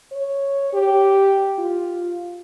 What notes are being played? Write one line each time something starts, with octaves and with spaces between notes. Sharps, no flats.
C#5
G4
F4